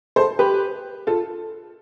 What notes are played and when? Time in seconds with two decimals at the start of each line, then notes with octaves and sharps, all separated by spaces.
0.16 A4 C5
0.39 G4 B4
1.07 F4 A4